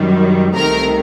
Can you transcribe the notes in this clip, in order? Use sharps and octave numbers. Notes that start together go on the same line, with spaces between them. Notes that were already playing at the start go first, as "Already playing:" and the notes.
Already playing: F#2 D#3 G3
C2 C3 D#3 A3 A#4 A#5